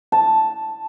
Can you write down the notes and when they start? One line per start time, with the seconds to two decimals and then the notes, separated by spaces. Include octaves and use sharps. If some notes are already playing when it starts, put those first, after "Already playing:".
0.12 A5